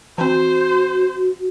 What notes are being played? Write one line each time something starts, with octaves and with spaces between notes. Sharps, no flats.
E3 C4 F#4 C5